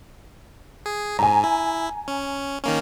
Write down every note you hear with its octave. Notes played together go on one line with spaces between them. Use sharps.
G#4
G#2 G#5 A#5
E4
C#4
D#3 A#3 C#4